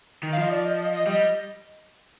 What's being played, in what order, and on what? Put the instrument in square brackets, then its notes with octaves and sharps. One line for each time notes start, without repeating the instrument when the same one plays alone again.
[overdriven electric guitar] D#3
[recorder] F5
[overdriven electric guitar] F3 [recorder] D#5
[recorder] D5
D#5
D#5
D#5
[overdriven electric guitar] G3 [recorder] D#5